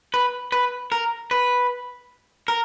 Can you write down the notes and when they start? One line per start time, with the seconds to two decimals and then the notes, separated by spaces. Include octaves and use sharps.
0.14 B4
0.52 B4
0.92 A#4
1.31 B4
2.48 A#4